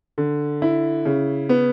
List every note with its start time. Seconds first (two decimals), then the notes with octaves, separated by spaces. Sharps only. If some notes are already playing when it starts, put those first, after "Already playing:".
0.18 D3
0.62 E4
1.05 C#3
1.49 B3